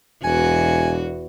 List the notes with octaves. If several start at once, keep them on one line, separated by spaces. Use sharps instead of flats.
E1 E2 F#4 G#5